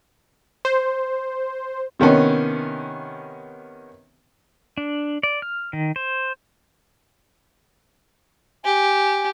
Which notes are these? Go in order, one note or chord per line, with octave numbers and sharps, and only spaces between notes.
C5
C3 D#3 B3 C#4
D4
D5
F6
D#3
C5
G4 G#5